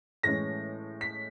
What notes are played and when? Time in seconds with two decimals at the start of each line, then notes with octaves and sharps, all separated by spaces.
0.23 A2 E3 G#3 C#4 A#6
1.01 B6